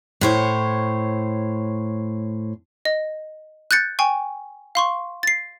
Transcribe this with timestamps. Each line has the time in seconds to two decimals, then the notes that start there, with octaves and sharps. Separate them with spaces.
0.21 A2 C5 C#5
2.85 D#5
3.71 F#6 G6 A6 C#7
3.99 G5 G#5 C#6
4.75 F5 C6 C#6
5.23 A6 C7